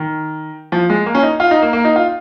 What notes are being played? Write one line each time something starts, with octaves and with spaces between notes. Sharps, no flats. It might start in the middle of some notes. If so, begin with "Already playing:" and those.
Already playing: D#3
F3
G#3
A#3
C#4
D#4
F4
D#4
A#3
A#3
D#4
F4